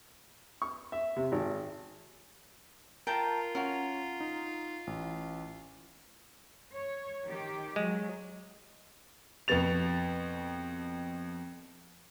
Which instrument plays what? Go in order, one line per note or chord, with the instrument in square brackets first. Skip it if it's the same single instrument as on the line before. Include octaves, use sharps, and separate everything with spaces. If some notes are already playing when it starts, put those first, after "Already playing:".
[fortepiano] C#6
E5
C3
G#1
[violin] F4 [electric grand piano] A#4 [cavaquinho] G5 A5 A#5
[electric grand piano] C#4 [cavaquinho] F#4 A#4
[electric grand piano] D#4
A1
[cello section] C#5
D#3 G4
[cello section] F#3 [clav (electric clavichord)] G#3
[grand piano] F2 B2 B3 A6 F7